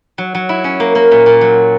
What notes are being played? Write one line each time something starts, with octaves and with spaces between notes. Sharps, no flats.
F#3
F#3
E4
C#4
A#3
A#3
A#2
A#2
F#3